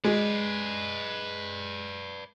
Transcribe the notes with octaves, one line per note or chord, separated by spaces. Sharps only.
G#3 B4 D5